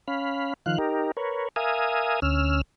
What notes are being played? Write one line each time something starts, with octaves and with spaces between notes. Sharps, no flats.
C#4 F5 B5
D#3 F3 F5 F#6
D#4 G4 A#4
A#4 B4 C#5
A#4 E5 F5 G#5 D#6
D2 C#4 E6 F6